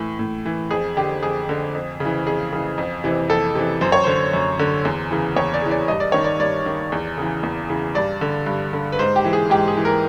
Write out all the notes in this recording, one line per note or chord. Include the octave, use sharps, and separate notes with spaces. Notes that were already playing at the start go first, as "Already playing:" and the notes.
Already playing: A2 E3
A2
E3
F2 G#4
D3 G4
F2 G#4
D3
F2
C#3
E3
F2 G#4
C#3 E3
F2
C3 E3
F2 A4
C3 E3
F#2 C5
C#5
D3 C5
F#2
D3
E2
C#3 E3
E2 C#5
D5
C#3 E3
D5
G2 D#5
D5
D#3 C#5
D5
G2 D5
D#3
E2
C#3 E3
E2
C#3 E3
G2 D5
D3
G2
D3
B4
G#2 C5
G4
E3
G#4
G#2 G4
G#4
E3
A#4